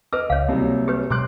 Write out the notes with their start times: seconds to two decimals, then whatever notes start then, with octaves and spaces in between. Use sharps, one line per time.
0.13 B4 D#5 D6 E6 F6
0.30 C#2 C#5 F5
0.48 C2 C3 F#3 A#3
0.88 G4 B4 C#5
1.10 B2 F#3 G#3 C6 D6 F#6